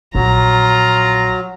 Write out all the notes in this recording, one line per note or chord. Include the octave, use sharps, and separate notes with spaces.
A#1 F#3 F4 A#5